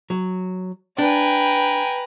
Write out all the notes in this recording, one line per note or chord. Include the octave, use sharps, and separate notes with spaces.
F#3
D4 B4 G5 G#5 A#5